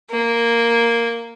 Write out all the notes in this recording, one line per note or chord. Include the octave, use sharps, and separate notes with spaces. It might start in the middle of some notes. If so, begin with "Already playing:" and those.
A#3